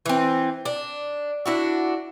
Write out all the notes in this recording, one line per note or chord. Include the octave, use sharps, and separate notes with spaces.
E3 C4
D4
D4 E4 F#4